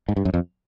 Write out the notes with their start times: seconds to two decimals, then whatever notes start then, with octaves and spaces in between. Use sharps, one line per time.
0.08 G#2
0.16 G2
0.25 F#2
0.34 F2